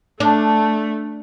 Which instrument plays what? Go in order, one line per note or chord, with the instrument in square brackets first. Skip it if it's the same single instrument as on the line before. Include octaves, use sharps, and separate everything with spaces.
[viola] A3 [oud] D4